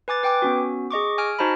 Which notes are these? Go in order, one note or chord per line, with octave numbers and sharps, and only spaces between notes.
B4 G#5 D6 A6
B4 G5 G#5 D6
B3 C#4 F#4
G#4 D#5 C#6 D6
G#5 F6 D7
D#4 F#4 C5 D#5 A5 B5